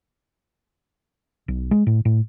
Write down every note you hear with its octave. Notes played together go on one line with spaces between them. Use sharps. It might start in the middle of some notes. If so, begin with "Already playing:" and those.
B1
G#3
A2
A2